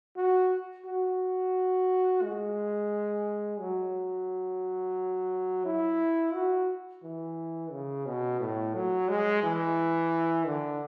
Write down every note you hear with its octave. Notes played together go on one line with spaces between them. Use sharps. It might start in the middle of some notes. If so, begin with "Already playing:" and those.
F#4
F#4
G#3
F#3
E4
F#4
E3
C#3
B2
A2
F#3
G#3
E3
D3